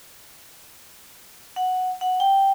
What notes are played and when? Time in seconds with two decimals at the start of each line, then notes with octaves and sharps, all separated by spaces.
1.56 F#5
2.01 F#5
2.20 G5